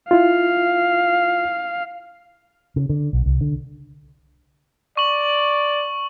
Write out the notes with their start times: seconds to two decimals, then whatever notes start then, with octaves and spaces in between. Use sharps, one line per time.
0.11 E4 F4 F5
2.76 C#3
2.89 D3
3.13 B1
3.26 C2
3.41 D3
4.97 D5 C#6 F#7